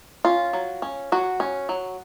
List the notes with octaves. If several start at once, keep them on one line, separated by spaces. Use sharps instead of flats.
C#4 F4
F#3
C#4
F#3 F#4
C#4
F#3